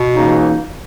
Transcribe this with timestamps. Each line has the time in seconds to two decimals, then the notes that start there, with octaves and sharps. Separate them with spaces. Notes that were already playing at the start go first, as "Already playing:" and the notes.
Already playing: B2
0.14 C#2 C#3 E3 A#3 D#4